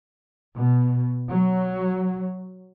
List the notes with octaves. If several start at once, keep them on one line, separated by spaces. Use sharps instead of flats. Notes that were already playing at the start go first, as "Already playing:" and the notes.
B2
F#3